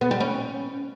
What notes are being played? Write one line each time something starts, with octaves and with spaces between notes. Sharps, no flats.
B3
G3
C#4